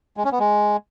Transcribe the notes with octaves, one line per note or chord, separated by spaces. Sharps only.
G#3
C#4
B3
G#3